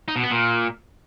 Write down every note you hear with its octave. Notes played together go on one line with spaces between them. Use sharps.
D#4
B2
B3
A#2